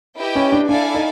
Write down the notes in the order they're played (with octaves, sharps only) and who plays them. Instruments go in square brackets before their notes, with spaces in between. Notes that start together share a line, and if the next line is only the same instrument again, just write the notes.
[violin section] E4 G4 B4 D#5 G5
[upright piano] C#4
D4
[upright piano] D4 [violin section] E4 A4 D5 F5 G#5
[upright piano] D#4